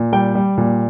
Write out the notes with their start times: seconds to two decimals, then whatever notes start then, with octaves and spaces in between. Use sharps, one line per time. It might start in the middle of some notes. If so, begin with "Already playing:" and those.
Already playing: A#2
0.13 G3 G5
0.35 G3
0.58 A#2